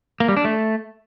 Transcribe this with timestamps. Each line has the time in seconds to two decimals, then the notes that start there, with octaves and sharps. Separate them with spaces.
0.20 A#3
0.28 G3
0.37 D4
0.45 A3